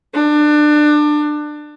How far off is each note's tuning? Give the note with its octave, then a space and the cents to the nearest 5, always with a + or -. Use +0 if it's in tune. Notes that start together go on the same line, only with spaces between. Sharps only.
D4 +25